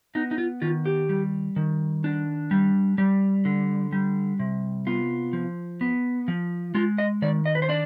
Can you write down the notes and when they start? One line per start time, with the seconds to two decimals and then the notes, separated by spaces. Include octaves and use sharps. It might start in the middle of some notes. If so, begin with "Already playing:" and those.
0.15 B3 D#4
0.31 D#4
0.38 F4
0.62 D#3 F4
0.86 G4
1.09 G3
1.56 D#3
2.04 D4
2.51 G3
2.98 G3
3.45 D3
3.92 G3
4.39 C3
4.87 B3 F4
5.33 F3
5.81 B3
6.28 F3
6.75 G#3 F4
6.98 D#5
7.22 D#3 D5
7.46 D#5
7.55 B4
7.62 C5
7.69 D4 D5